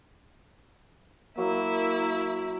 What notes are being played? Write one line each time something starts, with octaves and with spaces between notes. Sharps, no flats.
F#3 A#3 E4